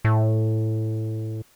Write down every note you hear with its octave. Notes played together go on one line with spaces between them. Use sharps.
A2